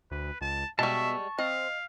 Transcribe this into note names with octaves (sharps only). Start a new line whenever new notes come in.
D2 B4
C#2 A5
B2 G3 G#3 E5 A5 C#6
C4 D#5 F5